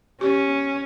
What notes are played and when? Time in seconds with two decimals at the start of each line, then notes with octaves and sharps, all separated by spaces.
0.21 C#4 G4